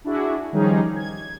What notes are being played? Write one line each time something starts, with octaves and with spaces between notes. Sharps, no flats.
D4 E4 F#4 G#4
D#3 F3 G3 C#4 D#4 G#4
G#6